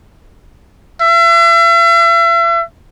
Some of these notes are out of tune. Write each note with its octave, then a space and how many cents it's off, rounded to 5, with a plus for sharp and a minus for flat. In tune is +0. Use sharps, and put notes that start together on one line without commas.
E5 +40